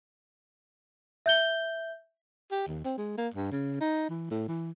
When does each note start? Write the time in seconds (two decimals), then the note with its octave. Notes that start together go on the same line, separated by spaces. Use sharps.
1.26 E5 G6 G7
2.51 G4
2.67 D#2
2.85 C4
2.97 G#3
3.18 A#3
3.34 G2
3.52 C#3
3.81 D#4
4.09 E3
4.31 A2
4.48 E3